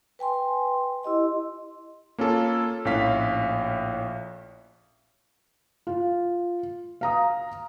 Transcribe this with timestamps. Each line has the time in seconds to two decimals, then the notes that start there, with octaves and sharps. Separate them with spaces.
0.19 B4 G5 G#5 C6
1.03 E4 G4 D#5 C6
2.18 A#3 C#4 F4 A4
2.85 A#1 A2 C#4 F5 B6
5.87 F4
7.01 F5 A#5 D#6